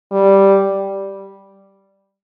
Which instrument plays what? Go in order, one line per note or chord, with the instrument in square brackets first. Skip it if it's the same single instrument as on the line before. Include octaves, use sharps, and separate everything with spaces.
[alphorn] G3